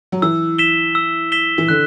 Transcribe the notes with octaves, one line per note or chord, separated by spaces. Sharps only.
F#3
E3 E6
B6 E7 G7
E6
B6 E7 G7
E3
D3 F#6